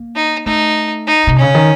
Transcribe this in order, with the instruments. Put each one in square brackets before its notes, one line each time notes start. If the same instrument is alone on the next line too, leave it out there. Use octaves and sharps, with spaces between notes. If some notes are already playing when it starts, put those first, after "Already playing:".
Already playing: [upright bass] A#3
[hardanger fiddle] D#4
[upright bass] A3 [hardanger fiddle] D#4
[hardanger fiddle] D#4
[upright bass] C3
[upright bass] C#3 [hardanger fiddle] C#4
[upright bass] D#3